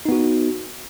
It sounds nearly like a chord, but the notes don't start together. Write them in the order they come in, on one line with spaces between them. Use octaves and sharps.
D#4 B3 F#4